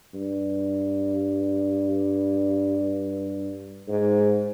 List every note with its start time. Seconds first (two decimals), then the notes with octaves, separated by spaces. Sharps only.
0.14 G2
3.88 G#2